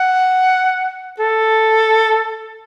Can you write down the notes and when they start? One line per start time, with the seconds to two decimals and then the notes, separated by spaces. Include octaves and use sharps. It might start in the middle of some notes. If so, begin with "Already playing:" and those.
Already playing: F#5
1.19 A4